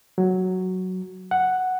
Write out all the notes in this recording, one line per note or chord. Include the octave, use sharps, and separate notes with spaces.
F#3
F#5